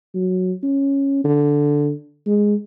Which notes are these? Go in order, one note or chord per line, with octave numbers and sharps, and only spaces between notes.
F#3
C#4
D3
G#3